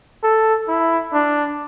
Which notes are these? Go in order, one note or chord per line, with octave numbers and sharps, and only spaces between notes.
A4
E4
D4